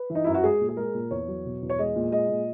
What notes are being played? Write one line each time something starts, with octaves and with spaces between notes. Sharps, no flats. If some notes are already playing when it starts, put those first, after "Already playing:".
Already playing: B4
E3
D#4
F#2 E4
F#4
G#3 G#4
A#2
G#4
G#3 A#4
A#2
E2 C#5
F#3
B2
E2
C#5
G#3 D#5
A#2
G#3 D#5
A#2